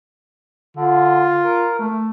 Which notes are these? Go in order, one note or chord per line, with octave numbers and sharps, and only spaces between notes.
D3 F4
A#4
A3